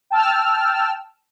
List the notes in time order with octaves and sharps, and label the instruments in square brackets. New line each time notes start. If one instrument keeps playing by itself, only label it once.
[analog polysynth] G5 A5 E6 F6